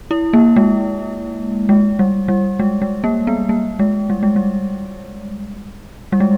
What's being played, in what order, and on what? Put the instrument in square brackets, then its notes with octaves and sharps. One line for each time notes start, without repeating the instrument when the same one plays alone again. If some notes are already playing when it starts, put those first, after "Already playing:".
[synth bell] E4
A#3
G#3
G#3
G3
G3
G#3
G#3
A#3
B3
A#3
G#3
G3
G#3
G3
G3
G#3